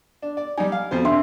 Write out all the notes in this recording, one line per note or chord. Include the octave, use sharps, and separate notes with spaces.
D4
D5
G3 D#4 G#5
F5
F2 B2 C5
C3 D4 E5 C6